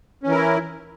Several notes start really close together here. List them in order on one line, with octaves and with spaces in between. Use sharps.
C#4 E3 A#4 E4